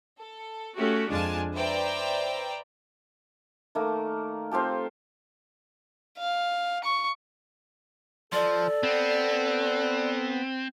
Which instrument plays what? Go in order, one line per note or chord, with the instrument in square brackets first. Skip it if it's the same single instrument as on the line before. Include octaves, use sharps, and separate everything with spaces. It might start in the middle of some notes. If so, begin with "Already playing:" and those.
[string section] A4
A3 C#4 F#4 G4
F2 G#3 D4 F4 G#5 A5
B4 C5 D5 E5 G5 A#5
[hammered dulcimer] D#3 A3 A#3
C4 F4 G4 A4
[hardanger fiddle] F5
C#6
[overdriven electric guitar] F3 [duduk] A4 [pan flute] D5
[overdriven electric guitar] B3 [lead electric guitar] C4